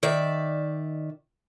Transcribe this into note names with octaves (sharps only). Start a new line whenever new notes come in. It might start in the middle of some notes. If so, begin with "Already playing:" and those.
D#3 D5 E5